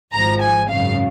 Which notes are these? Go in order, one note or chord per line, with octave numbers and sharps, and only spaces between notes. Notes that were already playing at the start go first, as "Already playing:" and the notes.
G#1 G#2 F3 A#5
G#5
G#1 F#2 C#3 F5